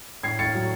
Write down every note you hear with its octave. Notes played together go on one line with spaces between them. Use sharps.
A2 G#6 C7
A2 A6 C#7
F#3